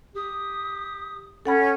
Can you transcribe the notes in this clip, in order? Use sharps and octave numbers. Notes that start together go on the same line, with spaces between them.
G4 D#6
C#4 A4 F#5 B5